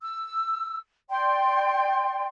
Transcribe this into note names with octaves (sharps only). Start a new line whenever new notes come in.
E6
D5 G5 C6